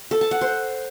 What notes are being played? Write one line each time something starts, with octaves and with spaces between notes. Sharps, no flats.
A4
A5
F#5
C5